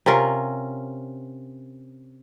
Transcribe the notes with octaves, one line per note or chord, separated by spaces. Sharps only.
C3 C#4 F4 A#4